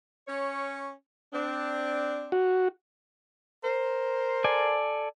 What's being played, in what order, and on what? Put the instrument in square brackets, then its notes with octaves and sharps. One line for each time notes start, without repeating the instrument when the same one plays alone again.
[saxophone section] C#4 C#5
C4 D4
[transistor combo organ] F#4
[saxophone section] A#4 C5
[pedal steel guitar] A4 D5 G#5